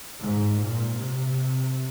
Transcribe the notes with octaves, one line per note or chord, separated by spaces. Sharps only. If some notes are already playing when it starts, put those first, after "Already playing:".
G#2
A#2
C3